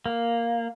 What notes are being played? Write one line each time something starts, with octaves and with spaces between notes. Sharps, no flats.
A#3